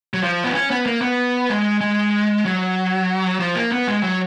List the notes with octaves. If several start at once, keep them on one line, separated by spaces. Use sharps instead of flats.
F#3
F3
B3
C#4
B3
A#3
B3
G#3
G#3
F#3
F3
A#3
B3
G#3
F#3